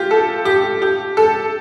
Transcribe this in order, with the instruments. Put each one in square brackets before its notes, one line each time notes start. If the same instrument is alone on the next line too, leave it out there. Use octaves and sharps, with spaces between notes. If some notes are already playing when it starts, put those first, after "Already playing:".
Already playing: [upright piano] F4 G4
A4
G4
G4
A4